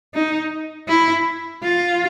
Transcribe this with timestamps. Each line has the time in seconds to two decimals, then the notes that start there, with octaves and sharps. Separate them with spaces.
0.14 D#4
0.88 E4
1.63 F4